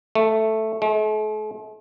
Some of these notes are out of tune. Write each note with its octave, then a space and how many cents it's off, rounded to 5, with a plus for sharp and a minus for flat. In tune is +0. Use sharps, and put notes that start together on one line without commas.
A3 +0
A3 -45